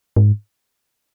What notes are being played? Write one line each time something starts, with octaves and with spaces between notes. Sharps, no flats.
G#2